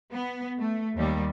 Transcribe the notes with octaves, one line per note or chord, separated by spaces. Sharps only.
B3
A3
D#2 G3